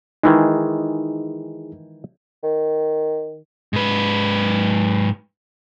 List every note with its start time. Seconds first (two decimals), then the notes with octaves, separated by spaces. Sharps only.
0.23 D#3 E3 G#3 D#4 E4 G#4
2.44 D#3
3.73 G#2 B4